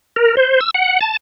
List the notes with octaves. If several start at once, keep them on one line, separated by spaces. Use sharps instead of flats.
A#4
C5
E6
F#5
A5